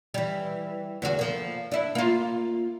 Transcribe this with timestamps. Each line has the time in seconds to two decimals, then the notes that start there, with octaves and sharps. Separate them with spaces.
0.14 E3 G3
1.02 E2 D3 F#4
1.19 F3 A#3
1.71 D4 E4
1.95 A#3 F4